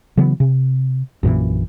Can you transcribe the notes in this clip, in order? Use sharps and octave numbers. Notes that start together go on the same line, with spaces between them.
C#3 E3 F#3 B3
C3
A#1 F#2 A#2 E3